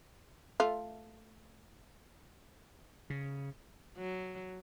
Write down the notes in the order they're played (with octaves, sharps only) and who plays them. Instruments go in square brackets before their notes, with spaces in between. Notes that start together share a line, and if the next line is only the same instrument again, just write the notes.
[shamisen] A3 F4
[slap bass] C#3
[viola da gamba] F#3